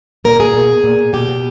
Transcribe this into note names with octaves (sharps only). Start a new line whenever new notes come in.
A#2 A#4
A#2 G#4
B2
B2
A#2
A#2
B2 G4
B2